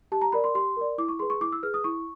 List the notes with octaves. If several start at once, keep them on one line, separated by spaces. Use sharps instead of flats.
G4 A5
A#5
A#4 D5 B5
C6
G4 C6
A#4 D5
E4 D6
C#6
G#4 B4 C6
C#6
E4 D6
E6
G#4 B4 F6
D#6
E4 C#6